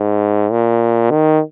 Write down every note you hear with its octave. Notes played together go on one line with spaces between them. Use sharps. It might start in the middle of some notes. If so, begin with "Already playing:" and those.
Already playing: G#2
A#2
D#3